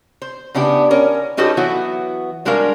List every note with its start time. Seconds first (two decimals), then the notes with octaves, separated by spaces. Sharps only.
0.22 C5
0.55 C#3 B3 D4 E4 G4
0.91 C#4 A#4
1.37 C#4 D#4 F#4 G4 A4 B4
1.57 E3 F#3 B3 E4 F#4
2.45 G3 G#3 D4 F#4 A#4 F5